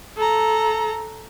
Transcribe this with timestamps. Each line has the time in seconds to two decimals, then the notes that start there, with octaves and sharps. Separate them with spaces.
0.17 A4 A#5